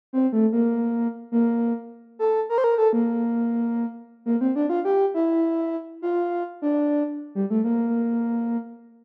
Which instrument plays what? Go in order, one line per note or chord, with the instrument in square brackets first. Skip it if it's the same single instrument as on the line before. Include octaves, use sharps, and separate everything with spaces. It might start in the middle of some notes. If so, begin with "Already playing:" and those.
[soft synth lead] C4
A3
A#3
A#3
A4
A#4
C5
A#4
A4
A#3
A#3
C4
D4
F4
G4
E4
F4
D4
G3
A3
A#3